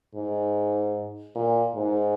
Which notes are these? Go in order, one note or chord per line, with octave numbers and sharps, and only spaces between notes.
G#2
A#2
G#2